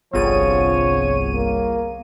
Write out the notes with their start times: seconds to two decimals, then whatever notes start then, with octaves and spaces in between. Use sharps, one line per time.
0.13 G1 C2 F3 B3 F4 G#4 C#5 D#7
1.34 A#3